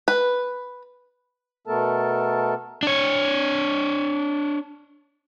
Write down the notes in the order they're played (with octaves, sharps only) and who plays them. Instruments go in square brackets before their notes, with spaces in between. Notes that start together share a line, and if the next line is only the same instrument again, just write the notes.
[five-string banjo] B4
[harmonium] B2 A3 B3 A4 A#4 A5
[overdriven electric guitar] D4 C#5